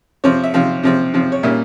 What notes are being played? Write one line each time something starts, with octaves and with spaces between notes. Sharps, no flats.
C3 F3 C4 C#5
E5
C3 F3 C4 F5
C3 F3 C4
C3 F3 C4
C#5
A#2 G3 A#3 C#4 E5